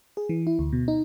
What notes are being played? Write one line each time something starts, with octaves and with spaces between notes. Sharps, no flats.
G#4
E3
E4
D2
B2
D#4